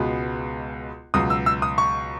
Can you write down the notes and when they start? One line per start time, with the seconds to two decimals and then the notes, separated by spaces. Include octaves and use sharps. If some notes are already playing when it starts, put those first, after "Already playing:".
Already playing: C#2 B2 G#3 B3
1.14 C#2 B2 F#3 D#6
1.30 E6
1.46 E6
1.62 D#6
1.78 C#6